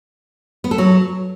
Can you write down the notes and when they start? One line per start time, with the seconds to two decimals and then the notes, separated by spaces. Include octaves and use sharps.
0.64 B3
0.71 A4
0.78 F#3